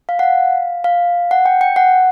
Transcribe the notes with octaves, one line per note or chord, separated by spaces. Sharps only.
F5
F#5
F5
F5
F#5
G5
G5
F#5